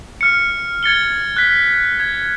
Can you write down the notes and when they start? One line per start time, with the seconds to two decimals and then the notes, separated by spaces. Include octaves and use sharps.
0.21 F6 C#7
0.83 G#6 A6 C#7 G7
1.37 F#6 B6
2.00 G#6